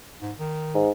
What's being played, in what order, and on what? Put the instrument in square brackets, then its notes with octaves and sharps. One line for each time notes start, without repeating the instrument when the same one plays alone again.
[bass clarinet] G#2
D#3
[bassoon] G#2